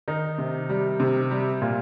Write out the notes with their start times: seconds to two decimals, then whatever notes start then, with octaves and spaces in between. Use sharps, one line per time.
0.08 D#3 D#4
0.38 C3
0.69 G3
1.00 C3
1.31 G3
1.62 A#2